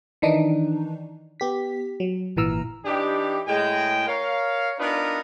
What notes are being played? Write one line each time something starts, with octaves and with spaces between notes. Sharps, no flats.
D#3 E3 D4 D#4
B3 G4 B6
F#3
G#1 A#2 E3 A#5 E6 F6
E3 D4 D#4 G4
A2 G#3 G5
A#4 C#5 F5
B3 D4 D#4 F4 A#4 B4